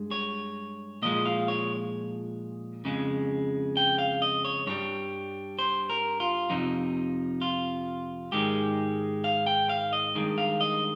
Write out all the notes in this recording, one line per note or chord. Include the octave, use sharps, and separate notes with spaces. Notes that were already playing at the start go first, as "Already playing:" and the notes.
Already playing: G2 G#3
C#5
A#2 F3 G#3 D#5
F5
C#5
F2 C#3 G#3
G5
F5
D#5
C#5
G2 G3 C#5
C5
A#4
F4
F2 C3 F3 D#4
F4
G#2 D#3 G#3 G4
F5
G5
F5
D#5
G2 D#3 G#3
F5
D#5